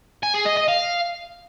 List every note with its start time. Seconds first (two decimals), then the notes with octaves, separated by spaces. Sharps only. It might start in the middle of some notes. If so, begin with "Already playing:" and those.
0.23 G#5
0.35 G#4
0.46 D#5
0.57 D#5
0.69 F5